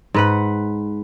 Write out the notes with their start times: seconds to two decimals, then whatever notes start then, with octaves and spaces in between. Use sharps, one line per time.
0.14 G#2 B4 F#5